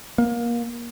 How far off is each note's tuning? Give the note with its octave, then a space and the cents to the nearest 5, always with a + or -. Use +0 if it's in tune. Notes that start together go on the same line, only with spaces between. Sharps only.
A#3 +25